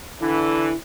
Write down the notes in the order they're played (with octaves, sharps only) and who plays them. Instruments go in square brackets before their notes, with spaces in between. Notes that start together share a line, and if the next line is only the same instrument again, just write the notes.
[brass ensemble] D3 E3 [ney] E4